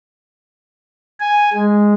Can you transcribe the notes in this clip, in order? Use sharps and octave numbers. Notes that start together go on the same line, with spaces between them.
G#5
G#3